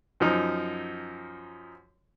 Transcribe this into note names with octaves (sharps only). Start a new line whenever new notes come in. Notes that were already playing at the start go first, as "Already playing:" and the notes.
F#2 F3 D#4